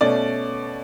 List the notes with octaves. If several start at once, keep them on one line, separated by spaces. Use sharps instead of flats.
B2 A3 C#4 D5